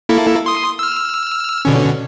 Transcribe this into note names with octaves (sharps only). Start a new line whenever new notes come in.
A#3 E4 A4
C6 D#6
E6 F6
B2 D3 C#4